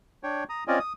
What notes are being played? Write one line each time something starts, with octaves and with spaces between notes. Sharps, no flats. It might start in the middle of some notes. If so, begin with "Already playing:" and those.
D4 C#5 G5
A#5 D#6
C4 C#4 F4 D5 D#5 G#5
D#6